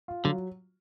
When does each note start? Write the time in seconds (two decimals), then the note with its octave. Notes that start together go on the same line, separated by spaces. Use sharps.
0.08 F4
0.24 D3 F#3